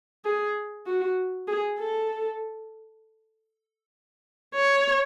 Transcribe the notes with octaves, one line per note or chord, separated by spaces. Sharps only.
G#4
F#4
G#4
A4
C#5